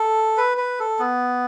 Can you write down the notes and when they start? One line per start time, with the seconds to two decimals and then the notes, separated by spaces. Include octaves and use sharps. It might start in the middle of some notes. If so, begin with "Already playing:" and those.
Already playing: A4
0.37 B4
0.57 B4
0.80 A4
0.99 B3